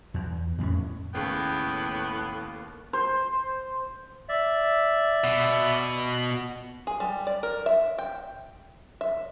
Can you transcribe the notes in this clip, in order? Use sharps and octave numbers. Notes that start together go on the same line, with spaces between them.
E2
F2 A2 A#3 C#4
D#2 A2 C#3 B3 G5
C5
D5 E5
B2
G#4
G3
D5
A#4
E5
G5
E5